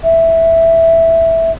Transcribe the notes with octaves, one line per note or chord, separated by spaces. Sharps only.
E5